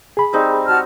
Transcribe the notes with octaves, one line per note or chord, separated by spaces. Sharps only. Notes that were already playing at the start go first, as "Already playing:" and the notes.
G#4 B5
G3 C4 D#4
F#4 A5 F6